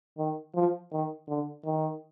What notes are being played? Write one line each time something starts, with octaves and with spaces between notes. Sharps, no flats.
D#3
F3
D#3
D3
D#3